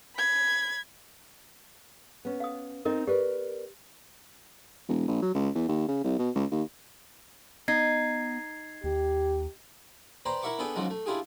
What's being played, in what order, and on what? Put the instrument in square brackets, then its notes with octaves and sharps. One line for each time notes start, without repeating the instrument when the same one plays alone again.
[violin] B5 G#6
[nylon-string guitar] B3 C#4
[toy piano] F5 D#6
[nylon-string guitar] C4 D#4 [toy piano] A#4 D#5
[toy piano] G4 [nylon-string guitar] A#4 B4 D5
[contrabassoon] E1
A#1
F#3
C#2
E2
D#2
C#3
C2
B2
C#2
D#2
[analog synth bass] B3 [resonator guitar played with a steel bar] D#4 [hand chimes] G#6 C7
[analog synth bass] D#2 [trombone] G4
[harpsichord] B4 C5 D5 G5 A#5 C6
E4 A#4 E5 F#5 C#6 D6
B3 D4 G#4 A4 B4 G5
G#2 C#3 F3 F#3 G#3
A3
D4 E4 F4 G4 G#4